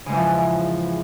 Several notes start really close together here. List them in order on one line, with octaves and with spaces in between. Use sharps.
C#3 G#2 E2 E3 F3